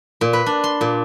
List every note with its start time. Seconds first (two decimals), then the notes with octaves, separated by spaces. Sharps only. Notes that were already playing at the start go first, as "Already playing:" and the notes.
0.21 A#2
0.33 B4
0.46 D4
0.64 C6
0.81 A#2